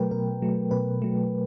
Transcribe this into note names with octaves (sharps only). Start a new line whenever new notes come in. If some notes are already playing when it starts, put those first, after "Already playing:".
Already playing: B2 F#3 A3 A#4 B4 G5
B2 A#4
F#3 A3
B2 B4
F#3 A3